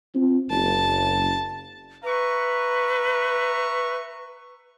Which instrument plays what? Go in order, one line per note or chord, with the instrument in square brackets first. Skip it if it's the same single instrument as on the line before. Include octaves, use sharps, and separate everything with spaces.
[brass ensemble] C4 F4
[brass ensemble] F#1 [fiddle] A5
[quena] B4 [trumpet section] E5 A#5 C#6